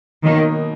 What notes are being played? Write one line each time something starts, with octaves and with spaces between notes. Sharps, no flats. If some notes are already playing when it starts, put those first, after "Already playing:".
B2 D#3 F#3 A#3 D#4